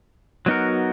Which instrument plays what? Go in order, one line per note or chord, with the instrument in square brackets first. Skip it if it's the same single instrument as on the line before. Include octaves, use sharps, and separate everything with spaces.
[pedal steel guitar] F#3 B3 D#4 F#4 A#4